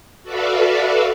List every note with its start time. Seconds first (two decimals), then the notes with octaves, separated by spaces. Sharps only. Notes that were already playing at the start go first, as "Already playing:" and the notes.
0.23 F#4 A4 B4 D5 E5 F5